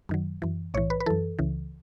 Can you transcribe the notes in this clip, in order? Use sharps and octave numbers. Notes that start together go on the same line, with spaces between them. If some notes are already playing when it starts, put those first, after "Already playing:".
F#2 D#3 F#3
F#2 E3
B1 A2 E3 C#5
B4
B4
F#2 E3 A4
C#2 C#3 E3